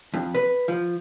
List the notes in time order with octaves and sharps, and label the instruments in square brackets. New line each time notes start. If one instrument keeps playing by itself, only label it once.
[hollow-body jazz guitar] F2
B4
F3